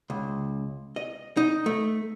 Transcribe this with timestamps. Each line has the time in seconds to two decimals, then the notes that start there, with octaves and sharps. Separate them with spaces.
0.10 C#2
0.96 D#5
1.37 D#4
1.66 A3